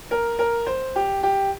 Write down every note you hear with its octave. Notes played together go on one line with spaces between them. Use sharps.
A#4
A#4
C5
G4
G4